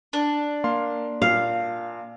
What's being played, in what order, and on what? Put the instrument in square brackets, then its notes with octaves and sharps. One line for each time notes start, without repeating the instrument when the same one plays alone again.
[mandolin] D4
[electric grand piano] A#3 F5 C6
[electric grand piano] A#2 [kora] F5